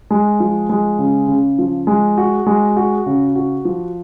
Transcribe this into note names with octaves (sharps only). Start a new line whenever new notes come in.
G#3
F3
G#3
C#3
C#3
F3
G#3
F#4
G#3
F#4
C#3
F#4
F3